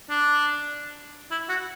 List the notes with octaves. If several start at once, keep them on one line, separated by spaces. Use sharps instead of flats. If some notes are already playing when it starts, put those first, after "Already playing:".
D4
E4
F#4